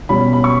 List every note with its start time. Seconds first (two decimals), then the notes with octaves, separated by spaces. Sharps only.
0.09 B2 G3 C#4 B5
0.33 B5
0.44 C#6